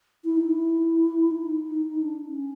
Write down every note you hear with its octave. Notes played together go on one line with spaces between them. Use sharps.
E4
D#4
E4
D#4
D4
C#4